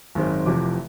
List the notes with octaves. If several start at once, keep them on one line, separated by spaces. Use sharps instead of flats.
G#1 F#2 D#3 G#3 C4
F1 F2 C3 E3 D6